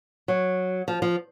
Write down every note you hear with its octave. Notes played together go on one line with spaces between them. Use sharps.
F#3
F3
F3